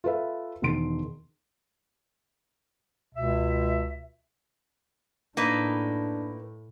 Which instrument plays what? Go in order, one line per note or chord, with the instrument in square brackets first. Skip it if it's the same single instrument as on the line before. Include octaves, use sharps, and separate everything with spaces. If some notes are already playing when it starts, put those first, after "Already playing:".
[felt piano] F4 A4 B4 E5
E1 D#3 C6 D7
[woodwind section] C#2 B2 E5
[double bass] A2 [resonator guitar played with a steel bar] A#3 D#4 B4 [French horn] D4